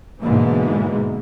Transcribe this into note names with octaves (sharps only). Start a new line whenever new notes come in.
G#2 B2 D3 E3 G#3 A#3